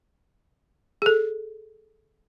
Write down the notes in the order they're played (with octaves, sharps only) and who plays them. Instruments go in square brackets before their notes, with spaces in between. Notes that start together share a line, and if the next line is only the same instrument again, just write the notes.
[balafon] G#4 A4